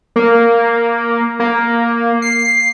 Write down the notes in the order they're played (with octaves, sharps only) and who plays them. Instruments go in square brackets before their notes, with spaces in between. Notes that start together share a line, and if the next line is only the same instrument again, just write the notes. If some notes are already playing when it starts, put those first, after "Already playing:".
[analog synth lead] A#3
A#3
C7